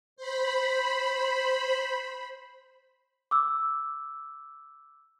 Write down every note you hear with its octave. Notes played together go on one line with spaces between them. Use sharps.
C5 B5
D6 E6